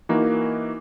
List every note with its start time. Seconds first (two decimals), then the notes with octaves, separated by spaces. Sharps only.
0.09 E3 A#3 D#4 F#4